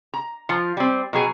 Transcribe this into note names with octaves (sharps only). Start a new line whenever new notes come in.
A#5
F3 F4
G3 C4
B2 F#3 G#4 G#5